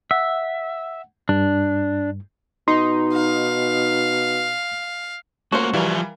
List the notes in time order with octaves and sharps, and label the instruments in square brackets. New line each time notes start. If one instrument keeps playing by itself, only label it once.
[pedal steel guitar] E5 [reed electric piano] F#5
[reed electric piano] G2 [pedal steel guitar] D4
[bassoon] B2 [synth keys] D#4 [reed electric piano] C6
[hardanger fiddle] F5
[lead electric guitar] A3 A#3 [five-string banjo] C#4 F4 C5 [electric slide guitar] F#4 F#5
[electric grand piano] E3 G3 [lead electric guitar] F3 E4 [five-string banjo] A#4 F5